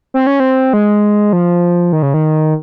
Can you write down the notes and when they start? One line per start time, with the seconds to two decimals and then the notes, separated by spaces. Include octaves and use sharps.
0.14 C4
0.27 C#4
0.40 C4
0.73 G#3
1.33 F3
1.93 D#3
2.03 C#3
2.14 D#3